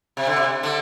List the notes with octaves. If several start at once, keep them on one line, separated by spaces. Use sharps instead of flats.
C3
D3
C3
D3